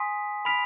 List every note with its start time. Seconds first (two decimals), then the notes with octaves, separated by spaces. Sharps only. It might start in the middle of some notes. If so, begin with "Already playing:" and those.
Already playing: G#5 C6 D#6 B6
0.45 B5 F6 B6 D7 F7